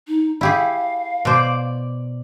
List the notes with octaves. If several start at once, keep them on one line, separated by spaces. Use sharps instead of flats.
D#4
E4 G4 G#4 F5
B2 C5 D5 D6